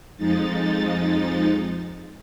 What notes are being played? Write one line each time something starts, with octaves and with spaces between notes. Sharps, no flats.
F2 F3 G#3 D#4 A6